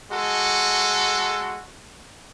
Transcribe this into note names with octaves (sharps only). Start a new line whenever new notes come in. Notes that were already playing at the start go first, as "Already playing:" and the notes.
G#3 F#4 A4